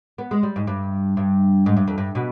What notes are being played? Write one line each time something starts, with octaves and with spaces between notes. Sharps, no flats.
B3
G#3
G3
G#2
G2
G2
G#2
G2
F2
G2
B2